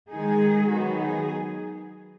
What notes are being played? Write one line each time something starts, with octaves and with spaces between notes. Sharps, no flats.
D#3 G#3 D#4 G#4
D#3 F#3 B3 D#4 F#4
G#4